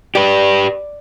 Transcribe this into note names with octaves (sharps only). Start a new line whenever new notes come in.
G4 B4 D5